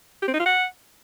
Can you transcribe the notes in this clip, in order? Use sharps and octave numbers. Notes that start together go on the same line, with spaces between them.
G4
C4
D#4
F4
F#5